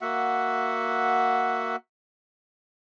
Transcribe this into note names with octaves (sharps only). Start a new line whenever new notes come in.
A#3 F#4 E5 F#5